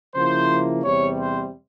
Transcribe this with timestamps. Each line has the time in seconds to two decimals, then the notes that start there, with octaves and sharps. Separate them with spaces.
0.15 C#3 F3 A#3 E4 C5
0.84 E2 C3 G3 C#5
1.18 C5